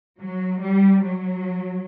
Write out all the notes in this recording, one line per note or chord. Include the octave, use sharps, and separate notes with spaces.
F#3
G3
F#3